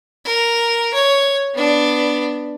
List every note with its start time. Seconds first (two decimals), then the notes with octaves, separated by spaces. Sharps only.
0.25 A#4
0.94 C#5
1.55 B3 D4